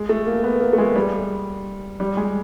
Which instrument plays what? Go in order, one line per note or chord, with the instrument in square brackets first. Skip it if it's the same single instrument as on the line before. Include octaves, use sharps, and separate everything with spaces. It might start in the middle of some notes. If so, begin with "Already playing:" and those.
Already playing: [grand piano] G#3
A3
A#3
B3
A#3
A3
G#3
G3
G3
G#3